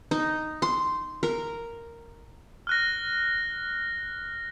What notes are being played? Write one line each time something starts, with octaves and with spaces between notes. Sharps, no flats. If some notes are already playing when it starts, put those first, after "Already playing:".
D#4
C6
A#4
F6 F#6 A#6